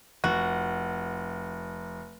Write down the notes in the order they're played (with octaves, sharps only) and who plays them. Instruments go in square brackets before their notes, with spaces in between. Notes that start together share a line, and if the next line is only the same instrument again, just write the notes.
[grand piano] F1 [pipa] F#4